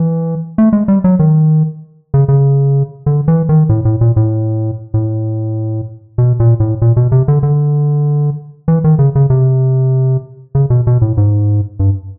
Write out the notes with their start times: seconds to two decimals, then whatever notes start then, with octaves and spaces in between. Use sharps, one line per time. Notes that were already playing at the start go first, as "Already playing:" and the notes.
Already playing: E3
0.58 A3
0.73 G#3
0.88 G3
1.04 F#3
1.19 D#3
2.14 C#3
2.28 C#3
3.06 D3
3.28 E3
3.49 D#3
3.69 A2
3.85 A2
4.01 A#2
4.16 A2
4.94 A2
6.18 B2
6.40 A#2
6.60 A2
6.82 A#2
6.97 B2
7.12 C3
7.28 D3
7.43 D3
8.68 E3
8.84 D#3
8.99 C#3
9.15 C#3
9.30 C3
10.55 C#3
10.70 B2
10.87 B2
11.02 A2
11.17 G#2
11.79 G2